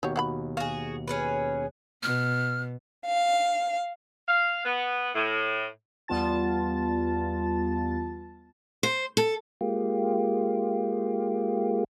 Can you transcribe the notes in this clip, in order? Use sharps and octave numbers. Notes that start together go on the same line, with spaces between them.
D#2 B2 F#3 G4 C#5
F#4 F#5 B5
F#4 G#4 F5
C#4 G#4 B4
B2 F6
F5
F5
B3
A2
E2 G3 B3 F4 A5 A6
C5
A4
G#3 A#3 F4 G4